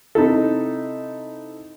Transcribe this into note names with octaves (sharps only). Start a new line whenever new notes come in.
C3 D#4 E4 A4